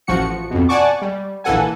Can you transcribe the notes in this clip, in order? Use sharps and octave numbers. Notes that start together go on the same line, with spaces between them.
A1 F3 F#4 C#7
F2 B2
D5 F#5 G#5 A5 C#6 D6
G3
A#1 E3 A#3 A4 F#5 G#5